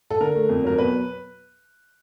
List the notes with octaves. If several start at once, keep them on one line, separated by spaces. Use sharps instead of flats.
A4
D3 A#4
A3
F2
F#3 A#4
B2 B4